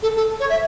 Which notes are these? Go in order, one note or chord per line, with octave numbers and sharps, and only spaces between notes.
A4
A4
C#5
E5